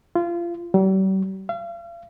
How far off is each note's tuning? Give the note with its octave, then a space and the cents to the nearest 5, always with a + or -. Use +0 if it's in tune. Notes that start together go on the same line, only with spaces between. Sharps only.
F4 -25
G3 -40
F5 -40